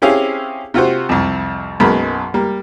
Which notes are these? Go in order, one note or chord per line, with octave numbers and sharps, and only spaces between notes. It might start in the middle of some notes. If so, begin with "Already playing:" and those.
C4 C#4 E4 G4 G#4 F5
C3 F4 F#4 C5
C2 F2
B1 F#2 G#3 A#3 B5
G3 A#3